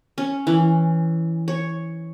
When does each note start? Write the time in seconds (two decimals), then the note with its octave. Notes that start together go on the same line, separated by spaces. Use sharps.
0.18 C#4
0.47 E3
1.48 C#5